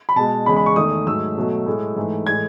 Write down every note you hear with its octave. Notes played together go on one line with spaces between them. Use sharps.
B5
B2 G#3 A5
E2 C#3 G#3 B5
B5
C#6
E2 D#3 A3 D#6
G#2 F#3 A3 E6
B2 F#3 A3
A2 G#3
G#2 E3 A3
A2 E3 G#3 G#6